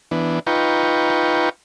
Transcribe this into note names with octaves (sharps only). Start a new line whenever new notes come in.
E3 B3 D4
D#4 F4 B4 G5 A#5 C#6